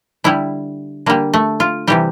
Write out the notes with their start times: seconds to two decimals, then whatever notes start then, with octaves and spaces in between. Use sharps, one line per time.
0.24 D3 G3 E4
1.06 D3 G3 A#3
1.34 A3
1.60 F4
1.87 C3 E3 G3 G4